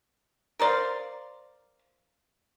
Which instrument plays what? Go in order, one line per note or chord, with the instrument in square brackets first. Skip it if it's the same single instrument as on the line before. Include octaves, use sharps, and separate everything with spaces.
[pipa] A#4 C5 D5 F5